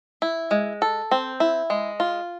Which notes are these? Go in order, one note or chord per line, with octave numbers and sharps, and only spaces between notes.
E4
G#3
A4
C4
E4
G#3
F4